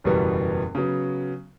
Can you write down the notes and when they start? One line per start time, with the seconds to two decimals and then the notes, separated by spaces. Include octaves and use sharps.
0.04 F#1 E2 B2 G3 B3
0.75 C#3 F#3 B3